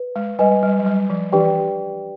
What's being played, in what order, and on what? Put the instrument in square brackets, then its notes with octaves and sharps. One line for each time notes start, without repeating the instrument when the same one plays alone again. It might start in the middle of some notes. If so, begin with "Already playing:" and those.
Already playing: [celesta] B4
[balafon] G#3
[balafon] G3 [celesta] B4 D#5 G#5
[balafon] G3
F#3
G3
F3
[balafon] E3 [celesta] D4 G4 B4 D5 G5